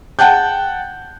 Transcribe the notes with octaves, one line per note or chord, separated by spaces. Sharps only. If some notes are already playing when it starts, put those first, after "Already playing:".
F#5 G5 A5 F#6 G6